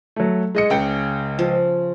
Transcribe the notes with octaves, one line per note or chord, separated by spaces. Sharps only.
F#3 A3
G#3 D#5 C#7
C#2 C#3 G5
F3